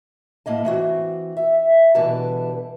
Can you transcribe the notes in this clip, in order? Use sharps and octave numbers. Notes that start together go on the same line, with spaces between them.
A2 A#3 D#5 A5
E3 C4 F#4
E5
B2 D3 E3 G3 B4 A5